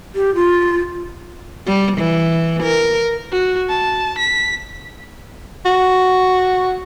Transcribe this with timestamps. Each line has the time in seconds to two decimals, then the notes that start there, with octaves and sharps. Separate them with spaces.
0.15 G4
0.35 F4
1.66 G3
1.97 E3
2.63 A#4
3.32 F#4
3.69 A5
4.18 B6
5.65 F#4